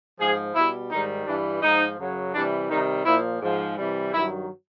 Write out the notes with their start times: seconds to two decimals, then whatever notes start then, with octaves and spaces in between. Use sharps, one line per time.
0.19 G#2 F3 G#4
0.55 B2 G3 E4
0.91 G#2 D#3 G3 D#4
1.27 G2 E3 G3 D4
1.63 G#2 F3 D#4
1.99 F#2 C#3 F#3
2.34 C3 E3 G3 D4
2.70 C3 D#3 G3 D#4
3.06 A#2 F3 E4
3.41 G#2 F3
3.77 C3 E3 G3
4.12 G2 D#3 F#3 E4